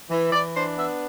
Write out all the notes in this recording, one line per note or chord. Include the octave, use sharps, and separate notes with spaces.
E3
E3 D5
D4 C5
B3 E5